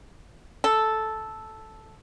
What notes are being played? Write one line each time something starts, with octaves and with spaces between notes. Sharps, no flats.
A4